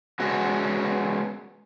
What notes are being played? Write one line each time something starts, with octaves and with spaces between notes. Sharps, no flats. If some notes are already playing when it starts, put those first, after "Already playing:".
G#3 B3 C#4 F#4